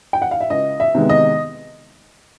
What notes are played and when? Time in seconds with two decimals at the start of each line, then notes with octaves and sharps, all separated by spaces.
0.13 G5
0.22 F#5
0.31 F5
0.40 E5
0.50 C#2 D#5
0.80 E5
0.95 C3 D#3 G#3 B3
1.09 D#5